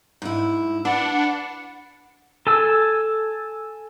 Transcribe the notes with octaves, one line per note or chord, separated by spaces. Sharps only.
G#2 E4
D4 B4 F#5
A4 G#5 E6